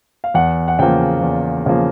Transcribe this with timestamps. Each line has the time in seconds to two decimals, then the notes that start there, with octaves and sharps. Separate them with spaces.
0.24 F5
0.34 E2 F#5
0.68 F#5
0.79 C#3 F3 A#3 G5
1.22 E2
1.66 C#3 F3 A#3